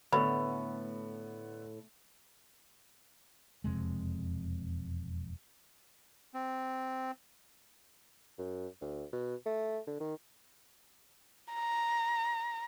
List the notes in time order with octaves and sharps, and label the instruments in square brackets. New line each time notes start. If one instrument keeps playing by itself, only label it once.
[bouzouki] A2 [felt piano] D3 A3 B3 [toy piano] B4 B5
[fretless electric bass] E1 F2 C3 G#3
[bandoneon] C4
[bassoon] F#2
D2
B2
A3
D3
D#3
[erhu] A#5